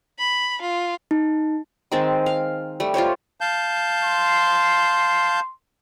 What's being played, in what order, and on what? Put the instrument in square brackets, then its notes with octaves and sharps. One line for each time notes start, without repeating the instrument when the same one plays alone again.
[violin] B5
F4
[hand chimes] D#4
[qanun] D#3 G#3 C4 A5
F5
G3 A3
F4 G4 C5 C#5
[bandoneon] F5 A5 G6
[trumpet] C6